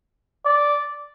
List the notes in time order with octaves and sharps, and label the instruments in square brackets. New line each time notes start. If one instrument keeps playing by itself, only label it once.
[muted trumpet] D5